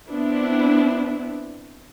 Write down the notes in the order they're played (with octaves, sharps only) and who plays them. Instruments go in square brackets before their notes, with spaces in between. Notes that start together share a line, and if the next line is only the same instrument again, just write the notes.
[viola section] B3 C4 D4 E4